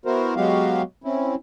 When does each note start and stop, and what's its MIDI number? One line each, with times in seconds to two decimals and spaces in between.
0.06 0.34 59
0.06 0.34 64
0.06 0.34 66
0.06 0.34 70
0.06 0.34 72
0.36 0.82 54
0.36 0.82 56
0.36 0.82 59
0.36 0.82 66
0.36 0.82 67
0.36 0.82 77
1.04 1.35 60
1.04 1.35 61
1.04 1.35 64